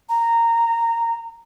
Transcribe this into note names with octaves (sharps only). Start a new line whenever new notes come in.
A#5